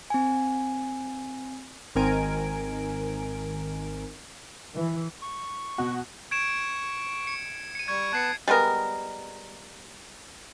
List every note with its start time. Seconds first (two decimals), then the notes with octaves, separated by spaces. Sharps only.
0.10 C4 G#5
1.95 G#1 D#3 C4 A#4 G#5 D7
4.75 E3
5.22 C#6
5.78 B2 F#4
6.31 C#6 G#6 D7 E7
7.27 C#7
7.75 C#7 D#7
7.88 G3 C#6 G#6
8.13 B3 A5 F#6 G#6 C7 C#7
8.48 G3 G#3 B3 A#4